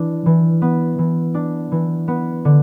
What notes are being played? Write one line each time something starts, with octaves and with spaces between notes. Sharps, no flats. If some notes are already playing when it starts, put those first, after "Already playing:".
Already playing: E3 D4
E3
B3
E3
D4
E3
B3
D3